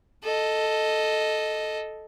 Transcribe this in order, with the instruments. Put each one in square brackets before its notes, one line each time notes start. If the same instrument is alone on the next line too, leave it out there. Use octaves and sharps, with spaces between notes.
[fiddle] A4 D#5